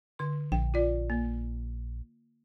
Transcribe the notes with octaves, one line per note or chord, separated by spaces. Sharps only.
D3 C6
A#1 G5
F4 D5
A#3